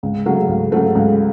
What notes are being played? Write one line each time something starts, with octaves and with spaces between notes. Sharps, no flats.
C#2
C#3 F#3 A3
C#2
C#3 F#3 A3
C#2